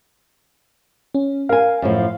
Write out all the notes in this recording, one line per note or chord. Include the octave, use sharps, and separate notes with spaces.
C#4
A#4 F5 G#5
F#2 A2 F3